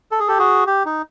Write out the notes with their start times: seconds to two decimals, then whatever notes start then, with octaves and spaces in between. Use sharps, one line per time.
0.12 A4
0.20 G#4
0.28 G4 A4
0.39 F#4 G#4
0.67 G4
0.86 D#4